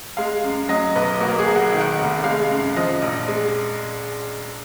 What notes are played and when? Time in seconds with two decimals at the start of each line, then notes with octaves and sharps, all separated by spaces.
0.17 G#3 F5
0.44 F#2
0.69 F#3 D#5
0.96 B1 B4
1.20 A#3 F#4
1.39 G#4
1.47 B1
1.56 F#5
1.72 D#3
1.81 F#5
1.98 F1
2.24 G#3 F5
2.51 F#2
2.76 F3 D#5
3.02 A#1
3.28 G#3